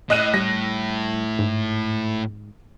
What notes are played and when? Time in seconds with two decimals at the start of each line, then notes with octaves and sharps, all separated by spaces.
0.10 A2 D#5 F#6 D#7
0.34 G3 A#6
1.39 G#2